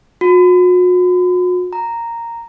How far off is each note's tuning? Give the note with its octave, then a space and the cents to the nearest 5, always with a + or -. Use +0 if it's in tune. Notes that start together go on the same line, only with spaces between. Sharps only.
F#4 -40
A#5 -5